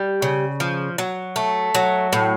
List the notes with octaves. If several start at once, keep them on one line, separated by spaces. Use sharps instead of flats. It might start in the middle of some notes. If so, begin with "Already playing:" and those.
Already playing: G3
C#3
F3
F#3
A3
F#3
A2